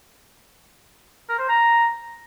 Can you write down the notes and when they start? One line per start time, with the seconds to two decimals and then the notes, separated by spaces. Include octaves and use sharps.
1.29 A#4
1.39 C5
1.49 A#5